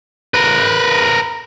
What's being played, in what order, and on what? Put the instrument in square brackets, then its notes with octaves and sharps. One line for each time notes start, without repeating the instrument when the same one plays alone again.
[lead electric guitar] A#4 B4